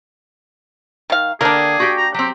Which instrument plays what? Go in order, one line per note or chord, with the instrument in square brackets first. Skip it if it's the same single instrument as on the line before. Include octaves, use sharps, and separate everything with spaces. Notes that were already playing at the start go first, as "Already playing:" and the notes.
[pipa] D#3 F5
[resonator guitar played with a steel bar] D3 A#4 G5 [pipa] A#3 D4 [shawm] G#4
[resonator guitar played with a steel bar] F#4 G4 G5
[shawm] A#5
[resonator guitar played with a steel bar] F#3 C4 [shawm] G4